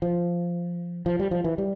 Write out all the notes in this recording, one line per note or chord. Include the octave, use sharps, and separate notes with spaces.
F3
F3
G3
F3
E3
G3